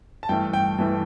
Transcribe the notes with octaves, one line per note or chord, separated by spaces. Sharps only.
A5
G2 E3 A3 G5
G5
G2 E3 A3